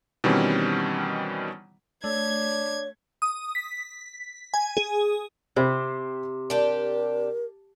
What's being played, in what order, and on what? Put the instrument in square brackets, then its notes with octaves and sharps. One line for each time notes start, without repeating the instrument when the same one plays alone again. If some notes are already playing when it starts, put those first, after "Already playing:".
[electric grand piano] B2 D#3 E3 G3 C4 C#4
[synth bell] A3 [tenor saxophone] D4 [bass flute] C#5 [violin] G#6
[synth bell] D#6
B6
G#5
G#4
[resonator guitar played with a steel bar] C3 [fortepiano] G4 C5 B5
[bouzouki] D4 G4 [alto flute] A#4 [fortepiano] A5